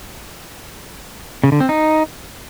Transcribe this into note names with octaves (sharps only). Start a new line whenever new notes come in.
C#3
D3
C4
D#4